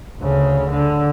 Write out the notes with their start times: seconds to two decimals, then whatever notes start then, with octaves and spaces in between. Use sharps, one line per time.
0.20 D2 C#3
0.70 D3